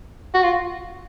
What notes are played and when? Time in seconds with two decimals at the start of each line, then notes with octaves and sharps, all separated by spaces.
0.34 F#4
0.43 F4